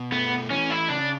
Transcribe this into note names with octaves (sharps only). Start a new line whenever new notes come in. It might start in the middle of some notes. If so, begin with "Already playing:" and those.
Already playing: B2
A3 B3
E3 C#4
E4
C#3 D4